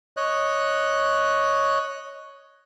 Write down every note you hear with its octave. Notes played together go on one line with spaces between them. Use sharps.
C#5 D#5 F#6